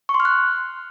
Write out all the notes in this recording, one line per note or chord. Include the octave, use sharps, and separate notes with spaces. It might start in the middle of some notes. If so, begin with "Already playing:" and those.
C#6
C6
F6
F#6